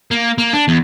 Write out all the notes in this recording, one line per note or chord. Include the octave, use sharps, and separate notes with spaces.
A#3
A#3
D4
E2